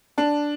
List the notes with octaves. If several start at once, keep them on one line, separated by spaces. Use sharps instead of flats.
D4